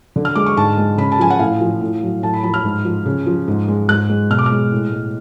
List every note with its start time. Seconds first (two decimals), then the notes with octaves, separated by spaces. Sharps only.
0.16 D3
0.25 F6
0.35 G#3 D6
0.46 C#6
0.56 G#2 A5
0.78 G#3
0.98 C#3 B5
1.12 A5
1.19 F3 G#5
1.30 F#5
1.39 A2 F5
1.61 F3
1.81 A2
2.02 F#3
2.23 A2 A5
2.34 B5
2.44 F3 B5
2.54 F6
2.64 G#2
2.85 F3
3.06 C#3
3.26 F3
3.48 G#2
3.68 G#3
3.88 G#2 F#6
4.09 G#3
4.30 B2 F6
4.39 D6
4.46 F6
4.51 G#3
4.72 A2
4.92 G#3